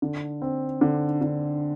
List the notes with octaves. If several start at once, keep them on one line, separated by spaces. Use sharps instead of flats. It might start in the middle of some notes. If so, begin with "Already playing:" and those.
D3
C4
D3
D3